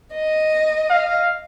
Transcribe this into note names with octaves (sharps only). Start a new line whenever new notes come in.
D#5
F5